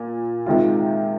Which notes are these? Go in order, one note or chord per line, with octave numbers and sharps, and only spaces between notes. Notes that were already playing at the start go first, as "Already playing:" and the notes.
Already playing: A#2
C3 D#3 G#3 C4 F4